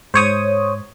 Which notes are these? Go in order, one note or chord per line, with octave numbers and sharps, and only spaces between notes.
G#2 C5 C#5 D#6